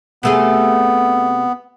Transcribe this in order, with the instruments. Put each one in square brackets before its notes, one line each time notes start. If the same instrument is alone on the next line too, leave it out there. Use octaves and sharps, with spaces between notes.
[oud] C3 A3 G#4 [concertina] B3